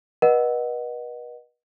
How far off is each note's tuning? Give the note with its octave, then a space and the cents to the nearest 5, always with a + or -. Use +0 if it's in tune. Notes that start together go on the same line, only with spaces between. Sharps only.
B4 -40 D#5 -15 F#5 +0